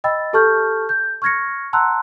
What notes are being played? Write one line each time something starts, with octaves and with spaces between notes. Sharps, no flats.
D#5 G5 B5 E6 A6
G4 A4 A5 C#6 F6 G6
G6
C#6 F6 G#6 A#6 C#7
F#5 A5 A#5 C6 E6 F#6